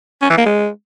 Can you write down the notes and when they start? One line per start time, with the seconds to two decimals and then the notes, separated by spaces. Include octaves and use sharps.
0.22 C#4
0.30 E3
0.38 A#3
0.46 G#3